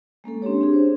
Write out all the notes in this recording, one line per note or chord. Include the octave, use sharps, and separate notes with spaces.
G#3 A#3 C#4 A4
C4 D4 G4 C#5
C4 D4 G4 G#4
C5